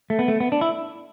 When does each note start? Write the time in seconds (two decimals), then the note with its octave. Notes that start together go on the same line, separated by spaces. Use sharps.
0.10 A3
0.19 B3
0.28 A3
0.40 B3
0.52 D4
0.61 E4